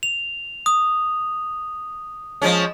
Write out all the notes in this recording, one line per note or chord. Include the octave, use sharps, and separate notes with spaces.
F7
D#6
F3 G#3 C#4